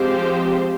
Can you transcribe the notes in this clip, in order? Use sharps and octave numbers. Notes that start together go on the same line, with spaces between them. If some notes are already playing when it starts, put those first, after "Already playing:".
Already playing: F3 G#3 C4 G4 C5